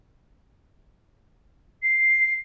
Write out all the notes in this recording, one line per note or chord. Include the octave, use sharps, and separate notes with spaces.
C7